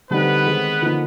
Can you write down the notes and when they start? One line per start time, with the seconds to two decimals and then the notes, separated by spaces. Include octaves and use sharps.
0.10 D3 G3 B3 C4 D#4 G4 B4
0.46 D#3 G#3 C4
0.82 D3 F3 A#3 D#4